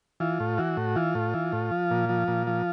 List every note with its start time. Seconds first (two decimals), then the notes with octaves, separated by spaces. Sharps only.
0.20 E3 F4
0.40 A2
0.58 E3 F#4
0.77 A2
0.96 E3 F4
1.15 A2
1.34 E3
1.52 A2
1.71 F3
1.91 A#2
2.09 F3
2.28 A#2
2.47 F3